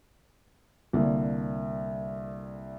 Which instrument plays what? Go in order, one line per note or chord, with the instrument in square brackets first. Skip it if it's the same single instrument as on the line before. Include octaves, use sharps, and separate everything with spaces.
[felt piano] C2 D3 A#3